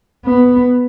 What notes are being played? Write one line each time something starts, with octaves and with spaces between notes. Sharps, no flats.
B3